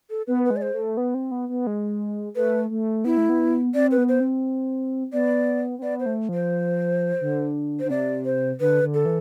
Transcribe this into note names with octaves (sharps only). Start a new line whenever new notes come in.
A4
B3 B4
B4
G#3
D5
C5
A3
B3
C4
B3
B3
G#3
A3 B4
A3
B3 E4
A3
B3
C4 D5
B4
B3
C5
C4
B3 D5
C4
B3 D5
C5
A3
F3 C5
D3
D3 C5
C3 D5
C5
D3 B4
D3
A4
E3